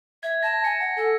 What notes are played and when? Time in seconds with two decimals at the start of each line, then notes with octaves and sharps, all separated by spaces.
0.23 E5 G#6
0.43 A5 A#6
0.64 G#5 C#7
0.80 F#5
0.96 A4